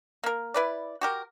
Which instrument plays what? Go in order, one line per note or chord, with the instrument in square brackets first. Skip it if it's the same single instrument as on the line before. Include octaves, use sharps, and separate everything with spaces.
[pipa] A#3 A#4
E4 B4 D5
F#4 G4 A#4